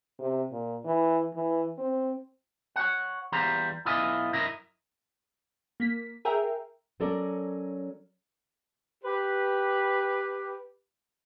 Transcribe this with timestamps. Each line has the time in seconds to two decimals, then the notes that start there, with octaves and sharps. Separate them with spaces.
0.19 C3
0.52 A#2
0.85 E3
1.35 E3
1.78 C4
2.76 C#5 F#5
3.32 E2 G3 F4 A#5
3.85 B1 B2 E4 F4 D#5 G#5
4.33 F#2 E4 A#4 D#5
5.80 A#3 B6
6.25 G#4 A#4 E5 G5
7.00 F#3 C#4 A4 A#4 D5
9.04 G4 B4